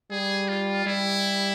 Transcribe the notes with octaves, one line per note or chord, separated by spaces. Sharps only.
G3 G#4
F4
G3 E4